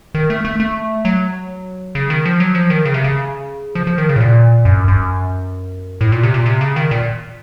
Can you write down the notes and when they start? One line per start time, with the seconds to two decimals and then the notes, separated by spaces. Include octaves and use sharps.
0.15 D#3
0.30 A3
0.45 A3
0.60 A3
1.05 F#3
1.95 C#3
2.10 D#3
2.25 F3
2.40 F#3
2.55 F3
2.70 D#3
2.85 C#3
2.94 C3
3.04 C#3
3.75 F3
3.87 F3
3.98 D#3
4.09 C#3
4.16 A2
4.21 A#2
4.65 F#2
4.88 F#2
6.01 A2
6.12 A#2
6.23 C3
6.34 A#2
6.46 C3
6.61 C#3
6.76 D#3
6.91 A#2